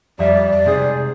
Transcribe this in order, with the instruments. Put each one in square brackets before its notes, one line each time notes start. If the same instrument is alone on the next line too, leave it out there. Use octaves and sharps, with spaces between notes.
[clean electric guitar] F2 E5 [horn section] G3 [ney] D5
[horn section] G#2 G#4 [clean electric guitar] C3